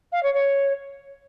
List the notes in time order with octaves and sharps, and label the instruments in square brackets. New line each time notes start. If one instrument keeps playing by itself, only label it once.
[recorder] F5
C#5
C#5